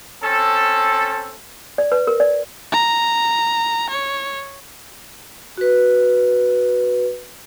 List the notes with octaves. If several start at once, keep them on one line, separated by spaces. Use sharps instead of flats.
C4 C#4 A4
D5
B4
A#4
D5
A#5
C#5
F#4 B4